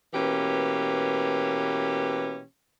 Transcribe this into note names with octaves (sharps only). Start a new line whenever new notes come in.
B2 E3 A#3 C#4 G4